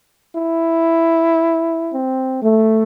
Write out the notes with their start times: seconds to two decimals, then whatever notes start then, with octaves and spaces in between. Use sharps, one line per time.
0.36 E4
1.92 C4
2.43 A3